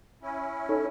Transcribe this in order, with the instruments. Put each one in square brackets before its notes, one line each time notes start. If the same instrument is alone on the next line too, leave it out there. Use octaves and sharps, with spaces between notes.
[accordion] C#4 E4
[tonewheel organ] D#4 A4 C#5